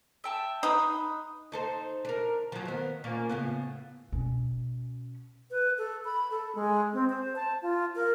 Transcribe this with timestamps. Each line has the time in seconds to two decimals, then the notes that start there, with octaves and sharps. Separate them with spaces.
0.24 E5 G5 A5
0.63 D#4 B4 D#6
1.52 D#4 A4 C5
2.05 D4 A#4
2.52 F3 F#3
2.65 D#3 B3
3.04 A#2 A#3 C#4
3.29 A2 C#3 B3
4.12 B2 C#4
5.51 B4
5.78 A4
6.05 B5
6.31 A4
6.55 G#3
6.94 C4
7.10 C5
7.36 A5
7.62 F4
7.95 A#4